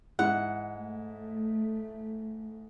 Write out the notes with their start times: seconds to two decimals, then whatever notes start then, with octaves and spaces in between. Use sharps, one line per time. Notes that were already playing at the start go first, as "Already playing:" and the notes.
0.19 G#2 E4 F#5
0.73 A3